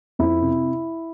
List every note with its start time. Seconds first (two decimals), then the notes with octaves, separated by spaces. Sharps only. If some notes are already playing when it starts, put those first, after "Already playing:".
0.19 F2 E4
0.41 C3